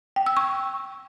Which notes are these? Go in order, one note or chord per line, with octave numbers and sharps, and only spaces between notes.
G5
E6
C#6